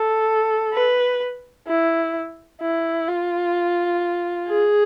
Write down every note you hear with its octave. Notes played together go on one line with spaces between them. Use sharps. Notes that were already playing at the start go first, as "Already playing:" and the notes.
Already playing: A4
B4
E4
E4
F4
G#4